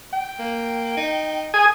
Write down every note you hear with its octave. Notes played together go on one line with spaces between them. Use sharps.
G5
A#3
D#4
G#4 G#5